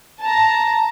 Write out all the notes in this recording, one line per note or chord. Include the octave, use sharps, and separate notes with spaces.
A5 A#5